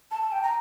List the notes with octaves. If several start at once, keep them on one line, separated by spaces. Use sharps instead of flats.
A5
A5
G5
A#5